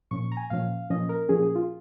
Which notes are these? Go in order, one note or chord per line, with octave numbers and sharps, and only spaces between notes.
A#2 F3 C#4 C#6
A#5
G#5
A#2 F3 C#4 F5
A#2 F3 C#4 D#5
A#4
A#2 F3 C#4 G#4
G#4
F4